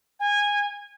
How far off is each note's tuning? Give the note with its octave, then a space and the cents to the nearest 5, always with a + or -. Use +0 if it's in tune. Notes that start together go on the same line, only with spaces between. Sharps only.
G#5 -20